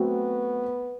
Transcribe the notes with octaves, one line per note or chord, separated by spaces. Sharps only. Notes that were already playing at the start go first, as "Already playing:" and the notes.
Already playing: F#3 A3 B3 C4 F#4